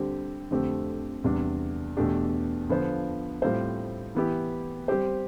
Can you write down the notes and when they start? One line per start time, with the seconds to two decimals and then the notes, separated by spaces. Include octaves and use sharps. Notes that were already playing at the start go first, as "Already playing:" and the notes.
Already playing: D3 G3 C4 G4
0.51 F2 D3 A3 C4 G4
1.24 E2 C3 G3 D4
1.97 E2 B2 A3 D4 G4
2.69 D3 F3 B3 F4 C5
3.42 A2 G3 C4 F4 C5
4.15 E3 B3 E4 G4
4.88 G3 C4 G4 C5